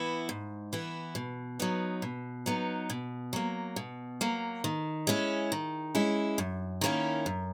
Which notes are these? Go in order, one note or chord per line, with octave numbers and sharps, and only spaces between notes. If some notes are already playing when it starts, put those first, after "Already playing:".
Already playing: E3 B3 E4
G#2
E3 B3 E4
B2
F#3 B3 D#4
B2
F#3 B3 D#4
B2
F#3 A#3
B2
F#3 A#3
D#3
G#3 C#4 E4
D#3
G#3 C#4 E4
F#2
D#3 A#3 C#4 E4
F#2